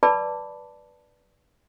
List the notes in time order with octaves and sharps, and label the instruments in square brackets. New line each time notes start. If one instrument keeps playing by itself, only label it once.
[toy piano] B4 D5 A5 B5 D6